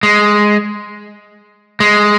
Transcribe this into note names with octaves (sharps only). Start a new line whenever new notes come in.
G#3
G#3